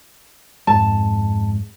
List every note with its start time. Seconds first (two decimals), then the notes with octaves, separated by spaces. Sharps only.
0.67 F2 G#2 G#3 A5